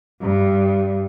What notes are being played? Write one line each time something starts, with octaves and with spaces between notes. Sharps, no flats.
G2